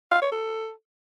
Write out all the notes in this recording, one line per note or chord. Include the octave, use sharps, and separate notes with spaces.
F5
C#5
A4